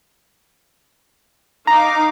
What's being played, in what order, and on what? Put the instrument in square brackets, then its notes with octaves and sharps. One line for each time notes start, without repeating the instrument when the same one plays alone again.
[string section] D#4 F5 D6 [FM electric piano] A#5